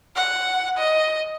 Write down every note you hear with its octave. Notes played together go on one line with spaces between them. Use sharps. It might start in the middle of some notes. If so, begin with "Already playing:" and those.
F#5
D#5